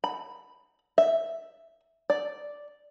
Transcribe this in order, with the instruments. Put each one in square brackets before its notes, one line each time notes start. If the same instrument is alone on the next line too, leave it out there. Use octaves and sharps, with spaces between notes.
[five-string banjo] B5
E5
D5